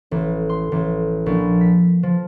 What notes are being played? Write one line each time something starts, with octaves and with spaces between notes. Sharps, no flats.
A1
C6
A1
A#1
B6
F3